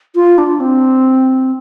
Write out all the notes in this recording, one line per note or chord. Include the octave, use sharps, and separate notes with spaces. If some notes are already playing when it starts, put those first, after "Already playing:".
F4
D4
C4